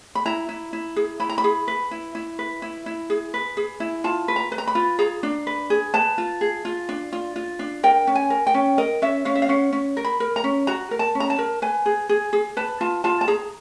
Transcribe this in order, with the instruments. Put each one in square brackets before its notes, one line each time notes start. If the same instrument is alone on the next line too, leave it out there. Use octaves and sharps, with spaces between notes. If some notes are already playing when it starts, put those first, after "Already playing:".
[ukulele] B5
E4 A#5
E4
E4
G#4
E4 B5
A#5
B5
G#4
B4
E4
E4
B4
E4
E4
G#4
B4
G#4
E4
F4 A5
B4
A#5
B4
A#5
B5
F4
G#4 A#5
D4
B4
G#4
B4 A5
F4
G#4
F4
D4
F4
F4
D4
A#4 G5
C#4
G#5
A#4
G5
C#4
A#4 D#5
C#4 E5
C#4 F5
E5
F5
C#4 F#5
C#4
A#4
B5
A#4
A#5
C#4
F#4 A#5
A#4
A5
C#4
A#5
A5
A#4
B4 G#5
G#4
G#4
G#4
B4 A5
F4 A5
F4 A5
A5
G#4 A#5